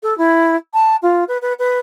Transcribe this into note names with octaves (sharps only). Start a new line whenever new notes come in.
A4
E4
A5
F4
B4
B4
B4